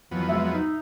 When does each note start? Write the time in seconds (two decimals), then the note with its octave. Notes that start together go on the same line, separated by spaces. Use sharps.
0.11 F2 E3 F#3 B3
0.29 G#3 E5
0.52 D#4